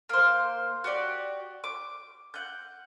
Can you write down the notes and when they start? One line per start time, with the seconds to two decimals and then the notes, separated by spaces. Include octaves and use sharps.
0.09 A#3 C5
0.84 F#4 G4 D5
1.64 D6
2.34 F#5 G6